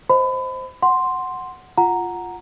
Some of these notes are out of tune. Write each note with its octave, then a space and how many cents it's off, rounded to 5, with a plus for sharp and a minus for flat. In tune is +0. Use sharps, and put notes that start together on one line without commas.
C5 +0 D#5 +0 B5 +30
F#5 +0 C6 +0
F4 +0 F#5 -5 A#5 +0